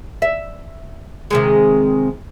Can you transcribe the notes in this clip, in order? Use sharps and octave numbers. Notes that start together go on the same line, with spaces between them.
E5
C3 D#3 G#3